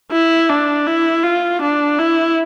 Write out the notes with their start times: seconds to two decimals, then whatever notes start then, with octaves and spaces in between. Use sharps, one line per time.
0.12 E4
0.49 D4
0.87 E4
1.23 F4
1.61 D4
1.98 E4